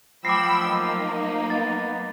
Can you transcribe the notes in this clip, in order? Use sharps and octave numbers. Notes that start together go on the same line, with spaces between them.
F3 F#3 A3 G5 B5 D6 E6 C7
A#3 D#4
B3 A6